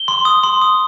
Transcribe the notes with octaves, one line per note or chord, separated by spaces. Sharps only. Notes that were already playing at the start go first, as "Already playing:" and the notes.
Already playing: G7
C6
D#6
C6
D#6